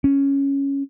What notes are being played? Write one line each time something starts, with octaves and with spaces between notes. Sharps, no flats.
C#4